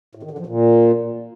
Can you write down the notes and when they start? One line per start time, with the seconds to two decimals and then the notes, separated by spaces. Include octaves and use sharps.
0.15 A2
0.23 D#3
0.31 D3
0.39 F3
0.46 A#2